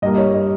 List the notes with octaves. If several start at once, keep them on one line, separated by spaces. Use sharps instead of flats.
G2 G3 A#3 D#5
C#5
D#5